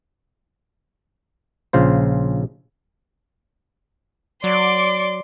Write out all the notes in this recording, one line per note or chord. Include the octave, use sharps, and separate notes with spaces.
A#1 C#3 F4 C5
F#3 D5 C6 D6